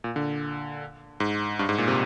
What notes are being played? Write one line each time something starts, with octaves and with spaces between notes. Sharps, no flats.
A#2
D3
G#2
G2
G#2
A#2
C3